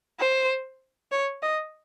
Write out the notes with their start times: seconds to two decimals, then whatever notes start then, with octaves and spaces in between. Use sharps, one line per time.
0.20 C5
1.12 C#5
1.42 D#5